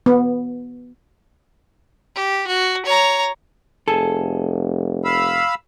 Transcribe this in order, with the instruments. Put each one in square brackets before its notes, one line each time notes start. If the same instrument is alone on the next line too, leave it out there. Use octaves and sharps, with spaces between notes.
[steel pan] B3
[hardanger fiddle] G4
F#4
C#5 A#5
[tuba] F1 [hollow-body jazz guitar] G#4 A4
[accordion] F5 B5 E6